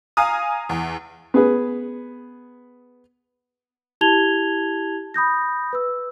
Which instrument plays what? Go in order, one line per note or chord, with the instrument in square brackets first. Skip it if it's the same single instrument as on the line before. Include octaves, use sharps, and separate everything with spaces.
[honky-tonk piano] F5 G#5 A#5 D#6
E2
[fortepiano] B3 G#4 B4
[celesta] E4 G4 A5 G#6 F7 G7
B5 D#6 G6 A#6
B4 E6